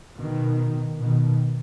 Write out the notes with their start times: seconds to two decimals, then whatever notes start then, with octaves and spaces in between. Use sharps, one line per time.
0.18 B2 D#3
1.02 B2 D#3